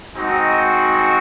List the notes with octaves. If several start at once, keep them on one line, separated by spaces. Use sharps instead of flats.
G#3 C4 D#4 F#4